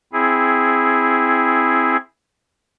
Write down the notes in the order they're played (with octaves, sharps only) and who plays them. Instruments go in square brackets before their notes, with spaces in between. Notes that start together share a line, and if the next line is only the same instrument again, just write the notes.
[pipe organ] C4 E4 G#4